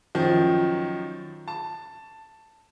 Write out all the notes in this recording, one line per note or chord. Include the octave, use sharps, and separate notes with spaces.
F#2 D#3 F3
A5